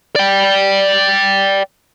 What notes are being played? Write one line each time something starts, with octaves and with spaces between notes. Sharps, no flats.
D5 G5